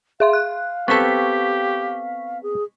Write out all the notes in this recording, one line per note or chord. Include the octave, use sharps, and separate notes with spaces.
G#4 E5 F5 C6
F#6
B3 C4 G4 A4 C#6 B6
G#4